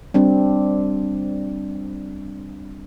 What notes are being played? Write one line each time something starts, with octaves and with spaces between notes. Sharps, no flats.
G3 C4 D4